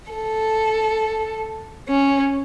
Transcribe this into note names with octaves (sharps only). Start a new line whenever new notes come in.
A4
C#4